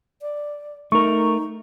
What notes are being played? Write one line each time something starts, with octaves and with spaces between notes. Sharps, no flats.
D5
A3 D#4 A#4 C#6